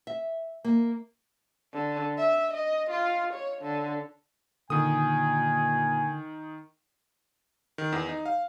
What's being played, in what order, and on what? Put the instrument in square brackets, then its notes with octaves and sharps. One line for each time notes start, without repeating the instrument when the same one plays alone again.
[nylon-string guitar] E5
A#3
[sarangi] D3
E5
D#5
F4
C#5
D3
[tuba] A#2 [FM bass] D3 [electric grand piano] D#3 D#6 [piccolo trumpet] G#5
[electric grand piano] D#3
E2
D#4
F5